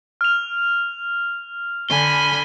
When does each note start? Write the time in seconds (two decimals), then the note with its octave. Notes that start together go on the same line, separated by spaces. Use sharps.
0.21 F6 F7
1.89 D3 G#5 B5 G7